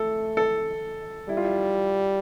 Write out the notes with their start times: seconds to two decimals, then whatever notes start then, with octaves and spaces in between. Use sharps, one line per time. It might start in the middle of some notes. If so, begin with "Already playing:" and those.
Already playing: A3 A4
0.37 A4
1.29 G3 E4
1.37 F4
1.45 E4